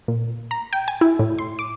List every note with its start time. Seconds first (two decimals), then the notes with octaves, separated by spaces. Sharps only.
0.08 A#2
0.51 A#5
0.73 G5
0.88 G#5
1.01 E4
1.19 A2
1.39 C6
1.59 D6